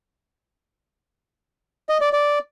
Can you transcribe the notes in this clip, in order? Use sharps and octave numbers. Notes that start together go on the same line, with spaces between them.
D#5
D5
D5